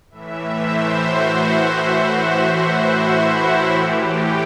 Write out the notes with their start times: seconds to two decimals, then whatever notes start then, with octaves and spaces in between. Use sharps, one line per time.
0.11 A2 E3 E5
0.56 C5
1.01 F#4
1.47 F#4
1.92 F#4
2.22 F#4
2.52 F#4
2.82 E4
3.27 F#4
3.72 A2 E3 G4